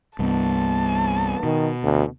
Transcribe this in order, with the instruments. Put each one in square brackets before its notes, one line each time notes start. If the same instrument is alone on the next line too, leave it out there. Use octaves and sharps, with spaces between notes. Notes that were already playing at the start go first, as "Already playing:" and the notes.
[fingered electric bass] C2 G2 [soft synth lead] B3 [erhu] A5
[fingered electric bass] B2 [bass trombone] D#3
[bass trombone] D2